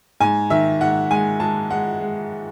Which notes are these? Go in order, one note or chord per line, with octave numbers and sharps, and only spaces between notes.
G#2 G#5
D#3 E5
G#2 F#5
G#3 G#5
G#3 A5
G#3 F#5
G#3